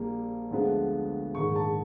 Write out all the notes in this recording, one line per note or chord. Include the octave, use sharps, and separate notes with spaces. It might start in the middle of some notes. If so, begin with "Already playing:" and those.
Already playing: A#1 A#2 G3 A#3
D2 D3 F3 G#3 B3
A#1 G#2 D#3 C#6
A5